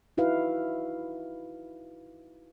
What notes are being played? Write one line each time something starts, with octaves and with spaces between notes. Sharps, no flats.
D#4 E4 F#4 B4 F5